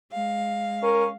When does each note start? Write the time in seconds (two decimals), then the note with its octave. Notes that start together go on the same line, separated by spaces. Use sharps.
0.13 G#3 F5
0.83 C#4 A#4